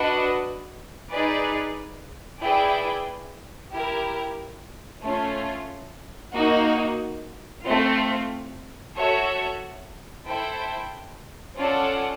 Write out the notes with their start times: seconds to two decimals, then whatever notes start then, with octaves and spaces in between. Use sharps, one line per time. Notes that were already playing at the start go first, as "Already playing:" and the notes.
Already playing: D4 F#4 B4 D#5
1.11 D#4 G#4 B4 D5
2.41 E4 G#4 B4 D5 G5
3.73 E4 G4 A#4
5.03 A3 C#4 F4
6.34 A#3 D#4 F#4
7.65 A3 C4 F4
8.95 F#4 A4 C#5 E5
10.26 E4 A4 C5 E5 G5
11.57 C#4 F4 A4 D5 F#5